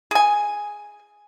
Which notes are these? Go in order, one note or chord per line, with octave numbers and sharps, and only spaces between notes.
G#4 G#5